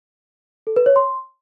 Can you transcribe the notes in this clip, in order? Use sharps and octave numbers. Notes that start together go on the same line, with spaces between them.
A4
B4
C#5
C6